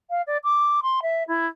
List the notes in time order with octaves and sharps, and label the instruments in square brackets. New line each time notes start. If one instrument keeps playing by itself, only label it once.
[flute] F5
D5
D6
C6
E5
E4